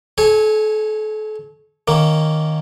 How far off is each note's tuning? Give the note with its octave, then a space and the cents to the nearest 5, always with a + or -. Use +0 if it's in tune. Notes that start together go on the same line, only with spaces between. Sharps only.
A4 -35 C#5 -15 G#5 +0
D#3 +0 A#3 +0 C#4 +5